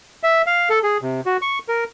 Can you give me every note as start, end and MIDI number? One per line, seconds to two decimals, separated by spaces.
0.23 0.42 76
0.47 0.69 77
0.70 0.79 69
0.83 0.97 68
1.02 1.21 48
1.26 1.37 66
1.42 1.59 85
1.68 1.84 70